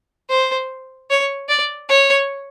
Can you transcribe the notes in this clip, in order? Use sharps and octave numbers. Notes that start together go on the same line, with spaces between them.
C5
C#5
D5
C#5